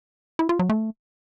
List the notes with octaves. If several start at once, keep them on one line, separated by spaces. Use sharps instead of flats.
E4
F4
F#3
A3